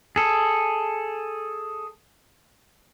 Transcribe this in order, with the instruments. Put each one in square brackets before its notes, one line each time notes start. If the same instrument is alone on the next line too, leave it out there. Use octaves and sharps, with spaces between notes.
[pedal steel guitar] G#4 A4